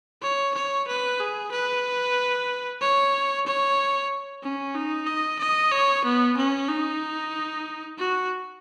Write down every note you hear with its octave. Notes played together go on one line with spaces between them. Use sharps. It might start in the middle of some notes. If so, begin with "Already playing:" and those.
C#5
C#5
B4
G#4
B4
C#5
C#5
C#4
D#4
D#5
D#5
C#5
B3
C#4
D#4
F#4